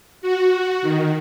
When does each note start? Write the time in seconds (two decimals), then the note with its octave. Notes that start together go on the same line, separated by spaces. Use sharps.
0.22 F#4
0.82 D#3